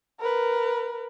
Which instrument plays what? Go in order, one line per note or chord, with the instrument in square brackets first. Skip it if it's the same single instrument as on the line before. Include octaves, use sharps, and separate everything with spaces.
[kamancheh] A#4 B4